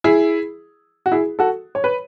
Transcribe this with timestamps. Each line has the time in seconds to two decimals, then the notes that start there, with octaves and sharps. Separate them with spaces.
0.04 E4 G#4
1.06 F#4
1.12 E4 G#4
1.39 F#4 A4
1.75 C#5
1.84 B4